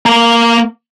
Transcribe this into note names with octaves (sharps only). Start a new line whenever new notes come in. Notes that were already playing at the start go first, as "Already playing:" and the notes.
A#3 A#5